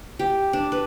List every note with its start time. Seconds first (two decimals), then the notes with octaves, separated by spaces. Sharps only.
0.19 G4
0.53 D4
0.72 B4